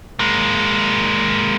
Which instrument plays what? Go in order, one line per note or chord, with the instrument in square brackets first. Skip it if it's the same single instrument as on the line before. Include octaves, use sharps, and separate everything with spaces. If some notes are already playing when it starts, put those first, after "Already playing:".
[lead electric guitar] G#3 A#3